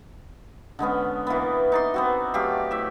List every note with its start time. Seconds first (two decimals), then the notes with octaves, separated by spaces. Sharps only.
0.79 D3 G#3 B3 C#4
1.27 E3 A#3 B3
1.72 D#4 D5 C6
1.94 B3 C4 F#4
2.34 F#3 A3 G4 F5
2.71 A2 E5